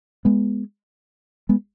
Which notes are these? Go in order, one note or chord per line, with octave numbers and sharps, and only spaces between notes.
G#3 B3
G#3 B3